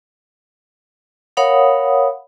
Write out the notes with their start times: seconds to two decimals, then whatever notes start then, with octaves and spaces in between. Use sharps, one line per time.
1.37 A#4 C#5 F5 F#5 B5 D#6